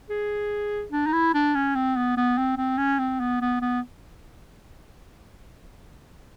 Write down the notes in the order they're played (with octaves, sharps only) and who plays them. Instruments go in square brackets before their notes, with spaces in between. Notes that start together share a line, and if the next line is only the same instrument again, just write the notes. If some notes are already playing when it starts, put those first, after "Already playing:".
[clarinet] G#4
D4
D#4
E4
D4
C#4
C4
B3
B3
C4
C4
C#4
C4
B3
B3
B3